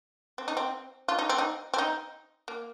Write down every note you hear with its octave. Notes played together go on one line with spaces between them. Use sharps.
C4
D#4
C4
F4
D#4
C4
D#4
C4
D#4
A#3